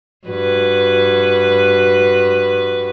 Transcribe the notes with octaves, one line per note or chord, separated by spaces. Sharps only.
G2 F#4 B4